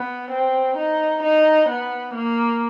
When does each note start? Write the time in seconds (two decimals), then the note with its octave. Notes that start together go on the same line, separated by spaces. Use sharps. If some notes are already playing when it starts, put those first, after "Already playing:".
Already playing: B3
0.31 C4
0.77 D#4
1.23 D#4
1.69 B3
2.15 A#3